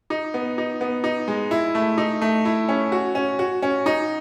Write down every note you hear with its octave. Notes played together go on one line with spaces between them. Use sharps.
D#4
B3
D#4
B3
D#4
G#3
E4
A3
D#4
A3
E4
C#4
F#4
C#4
F#4
C#4
D#4